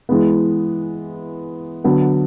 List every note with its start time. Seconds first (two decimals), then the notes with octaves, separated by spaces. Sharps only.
0.09 E3 G#3 B3
1.84 D3 F#3 B3